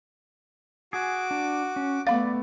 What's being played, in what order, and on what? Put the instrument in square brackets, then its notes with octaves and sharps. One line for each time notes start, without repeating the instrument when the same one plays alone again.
[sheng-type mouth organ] F#4 D6 [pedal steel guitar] G#4 G#5
[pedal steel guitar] D4
C#4
[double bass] A3 B3 [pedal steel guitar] D5 B5 D6 [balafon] F5